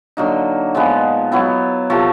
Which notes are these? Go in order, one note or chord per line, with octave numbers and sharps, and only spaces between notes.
D3 F#3 A#3 D#4
A#2 F3 G#3 B3
F#3 B3 E4
C3 F3 A3